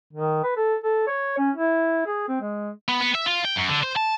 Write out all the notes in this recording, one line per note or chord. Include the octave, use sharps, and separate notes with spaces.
D#3
B4
A4
A4
C#5
C#4
E4
G#4
C4
G#3
B3
B3
E5
F4
G5
F#2
D3
C5
A5